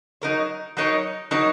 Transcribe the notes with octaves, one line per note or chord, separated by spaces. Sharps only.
F#3 D#4 A#4 C#5
F#3 D#4 A#4 C#5
F#3 D#4 A#4 C#5